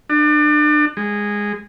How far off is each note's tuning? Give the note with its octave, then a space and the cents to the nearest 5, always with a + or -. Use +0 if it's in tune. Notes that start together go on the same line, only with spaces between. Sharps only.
D4 +30
G#3 -10